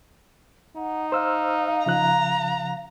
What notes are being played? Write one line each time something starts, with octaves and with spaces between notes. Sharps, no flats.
D#4 F#5
C5 F5 E6 F6
C#3 F3 A#5 F#6